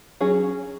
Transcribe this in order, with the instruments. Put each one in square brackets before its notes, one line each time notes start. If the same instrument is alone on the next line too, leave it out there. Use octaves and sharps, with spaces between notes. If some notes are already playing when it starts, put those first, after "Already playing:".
[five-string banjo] F#3 C#4 G#4